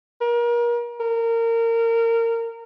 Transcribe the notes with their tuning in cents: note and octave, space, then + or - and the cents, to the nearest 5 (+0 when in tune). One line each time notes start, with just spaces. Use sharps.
A#4 +35
A#4 -20